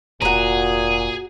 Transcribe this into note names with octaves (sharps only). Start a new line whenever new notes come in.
F1 A#2 F#4 G#4 A#5